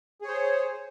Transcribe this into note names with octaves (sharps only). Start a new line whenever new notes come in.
G#4 C5 C#5